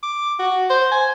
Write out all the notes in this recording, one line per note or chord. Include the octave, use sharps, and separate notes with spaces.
D6
F#4
C5
G#5